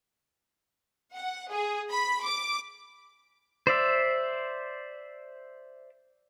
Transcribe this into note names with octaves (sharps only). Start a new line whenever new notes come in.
F#5
G#4
B5
D6
C5 D5 E5